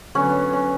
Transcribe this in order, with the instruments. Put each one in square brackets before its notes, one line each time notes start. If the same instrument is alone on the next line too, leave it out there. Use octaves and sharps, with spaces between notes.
[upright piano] D3 F#3 B3 [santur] C#4
[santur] C#4